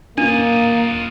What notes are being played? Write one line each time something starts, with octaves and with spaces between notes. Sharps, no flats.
A#3 D4 F4 D#5